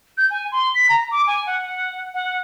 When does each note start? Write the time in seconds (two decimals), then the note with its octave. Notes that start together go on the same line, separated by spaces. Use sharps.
0.17 G6
0.30 G#5
0.52 C6
0.75 B6
0.89 A#5
1.11 D6
1.27 G#5
1.47 F#5
2.14 F#5